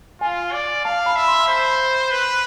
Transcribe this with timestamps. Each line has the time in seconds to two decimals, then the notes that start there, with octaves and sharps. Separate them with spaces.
0.21 F4 G#5
0.53 D5
0.85 F5 A5
1.06 B5
1.16 E5
1.28 C6
1.48 C5 B5
2.11 B4